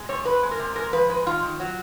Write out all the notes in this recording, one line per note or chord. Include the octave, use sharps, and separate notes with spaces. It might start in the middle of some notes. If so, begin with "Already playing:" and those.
Already playing: G#3
C3 C#5
C3 B4
G#3
A#4
C3
G#3 A#4
F3 B4
G#3 B4
D#3 F4
D#3
F#3